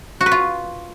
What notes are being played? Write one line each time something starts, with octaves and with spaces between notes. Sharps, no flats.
F#4
B4
F4